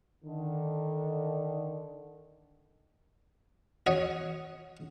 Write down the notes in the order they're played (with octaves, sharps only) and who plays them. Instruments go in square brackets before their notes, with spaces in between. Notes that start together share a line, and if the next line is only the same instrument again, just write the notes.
[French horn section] D3 D#3
[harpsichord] F#4 C#5 D#5